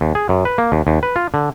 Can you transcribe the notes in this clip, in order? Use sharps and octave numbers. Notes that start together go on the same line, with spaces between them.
D#2
G#4
F#2
B4
A#3
D#2
D#2
B4
F4
D3